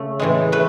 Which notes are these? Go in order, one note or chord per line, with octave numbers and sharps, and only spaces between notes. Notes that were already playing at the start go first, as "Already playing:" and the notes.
Already playing: C#3 A3
A2 E3 G#3
A3 B4